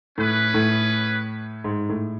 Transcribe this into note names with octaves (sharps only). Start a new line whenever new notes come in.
A2 C#4 G#4 B4
A2
G#2
A2